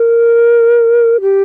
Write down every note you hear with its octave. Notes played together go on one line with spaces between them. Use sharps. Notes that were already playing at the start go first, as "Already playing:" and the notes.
Already playing: A#4
G4